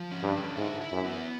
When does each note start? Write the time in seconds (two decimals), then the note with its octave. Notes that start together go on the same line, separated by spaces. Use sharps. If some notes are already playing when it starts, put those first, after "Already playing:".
Already playing: F3
0.11 C#4
0.23 G2
0.34 D3
0.57 G#2 E4
0.81 E4
0.92 F#2
1.04 B3